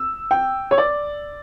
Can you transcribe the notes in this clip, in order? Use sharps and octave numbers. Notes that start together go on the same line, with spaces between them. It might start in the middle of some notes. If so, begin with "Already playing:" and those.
Already playing: E6
G5
C#5
D5